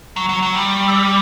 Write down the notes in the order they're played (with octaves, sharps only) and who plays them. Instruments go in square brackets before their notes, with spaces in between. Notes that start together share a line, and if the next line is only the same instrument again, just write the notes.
[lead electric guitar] F#3 [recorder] C#6
[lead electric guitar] F#3
F#3
G3
[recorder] E6
D6